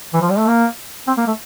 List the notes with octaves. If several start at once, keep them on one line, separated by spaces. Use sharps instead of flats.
E3
F3
G3
A3
A#3
C4
A#3
A3